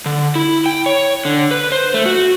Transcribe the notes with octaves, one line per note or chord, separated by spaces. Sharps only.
D3
E4
G5
C#5
D3
B4
C5
A3
F#4